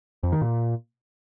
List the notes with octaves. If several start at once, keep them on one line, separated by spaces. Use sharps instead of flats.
F2
D#3
A#2